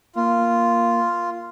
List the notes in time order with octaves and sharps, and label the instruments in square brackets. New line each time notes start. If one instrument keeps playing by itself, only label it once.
[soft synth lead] A#3 [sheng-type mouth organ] F4